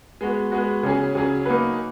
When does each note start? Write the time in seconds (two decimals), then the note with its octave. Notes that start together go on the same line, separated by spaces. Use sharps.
0.21 G#3 B3 F#4
0.52 G#3 B3 F#4
0.83 C#3 F#3 C#4 G#4
1.15 C#3 F#3 C#4 G#4
1.46 A#3 D#4 F#4 B4